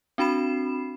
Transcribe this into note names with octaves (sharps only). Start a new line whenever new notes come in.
C4 D4 F#4 B5 C7 E7